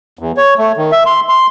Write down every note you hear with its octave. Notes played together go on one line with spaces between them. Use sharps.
E2
C#5
A3
D#3
E5
C6
C6